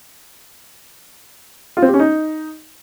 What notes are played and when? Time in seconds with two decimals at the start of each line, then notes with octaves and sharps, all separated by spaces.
1.77 F4
1.82 C4
1.88 G4
1.94 C#4
1.99 D#4